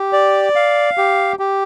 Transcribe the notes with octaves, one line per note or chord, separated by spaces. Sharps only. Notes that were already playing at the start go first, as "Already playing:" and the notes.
Already playing: G4
D5
F5
G4
G4